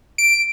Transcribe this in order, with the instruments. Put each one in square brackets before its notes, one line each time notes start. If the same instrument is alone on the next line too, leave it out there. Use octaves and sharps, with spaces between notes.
[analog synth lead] D7